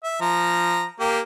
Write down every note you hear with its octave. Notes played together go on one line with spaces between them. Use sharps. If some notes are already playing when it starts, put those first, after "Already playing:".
E5
F3 A#5
A#3 G4